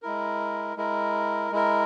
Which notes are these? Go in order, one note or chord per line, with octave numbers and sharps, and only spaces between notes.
G#3 E4 A#4
G#3 E4 A#4
G#3 E4 A#4